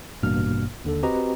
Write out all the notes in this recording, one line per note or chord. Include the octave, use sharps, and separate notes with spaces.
A1 G2 B2 A#3 F6
D#2 D3 A4
C4 F#4 G4 B4 D#5 A#5